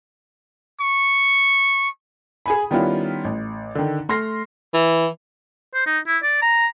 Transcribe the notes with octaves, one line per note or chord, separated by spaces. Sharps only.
C#6
G#4 G#5 B5
D#3 G3 B3 C#4 E4 F4
A1
D3 D#3
A3 C6 F6 A#6 C7
E3
C5
D#4
E4
D5
A#5